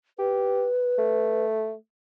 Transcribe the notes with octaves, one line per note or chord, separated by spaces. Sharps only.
G4 B4
A3